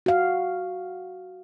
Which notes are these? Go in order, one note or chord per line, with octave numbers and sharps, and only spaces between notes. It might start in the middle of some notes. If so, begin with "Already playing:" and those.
F#4 F5